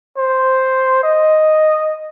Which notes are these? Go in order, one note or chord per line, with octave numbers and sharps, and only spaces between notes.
C5
D#5